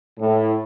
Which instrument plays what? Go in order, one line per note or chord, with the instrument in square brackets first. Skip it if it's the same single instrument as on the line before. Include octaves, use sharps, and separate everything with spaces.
[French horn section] A2